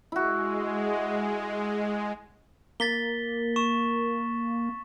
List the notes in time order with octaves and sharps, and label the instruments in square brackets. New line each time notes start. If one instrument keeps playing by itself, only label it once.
[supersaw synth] G#3 [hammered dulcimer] E4 F#4
[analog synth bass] A#3 [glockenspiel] A6 B6 G7
[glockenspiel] C#6 E7